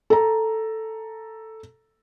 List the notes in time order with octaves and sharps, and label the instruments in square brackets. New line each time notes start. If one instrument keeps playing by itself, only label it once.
[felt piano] A4 A#5